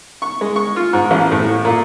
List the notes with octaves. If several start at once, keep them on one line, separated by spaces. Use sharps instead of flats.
C#6
G#3
C#6
F4
G#2
A1
A2
A#2